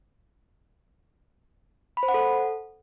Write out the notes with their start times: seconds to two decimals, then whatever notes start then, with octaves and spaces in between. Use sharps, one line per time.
1.97 B5
2.03 C5
2.08 F#5
2.14 A4